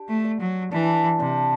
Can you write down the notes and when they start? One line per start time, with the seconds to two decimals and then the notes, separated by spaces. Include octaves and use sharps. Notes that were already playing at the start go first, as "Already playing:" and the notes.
Already playing: D4 G4
0.09 A3
0.24 D5
0.40 F#3
0.71 E3 D4
1.20 C3 D4